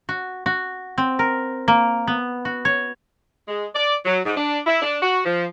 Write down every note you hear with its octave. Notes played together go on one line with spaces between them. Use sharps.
F#4
F#4
C4
A#4
A#3
B3
F#4
C#5
G#3
D5
F#3
G#2
D4
E4
D4
F#4
F3